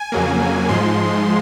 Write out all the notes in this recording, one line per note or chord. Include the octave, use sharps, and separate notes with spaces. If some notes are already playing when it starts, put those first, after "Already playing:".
Already playing: G#5
F2 C#3 F#3 A#3
G#2 F3 G#3 C6